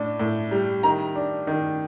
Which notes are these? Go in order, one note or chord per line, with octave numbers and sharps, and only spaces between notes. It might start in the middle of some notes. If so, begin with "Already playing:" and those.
Already playing: A2 D4
A2
G3
D#3 A#5
D4
D#3